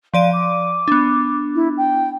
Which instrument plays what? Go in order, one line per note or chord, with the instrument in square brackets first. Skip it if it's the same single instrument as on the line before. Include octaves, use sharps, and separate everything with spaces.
[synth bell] F3 D5 D#7 [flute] F5
[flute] D6
[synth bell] B3 D4
[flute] E4
G5